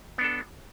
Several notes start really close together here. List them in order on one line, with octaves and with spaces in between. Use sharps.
B3 D4 A4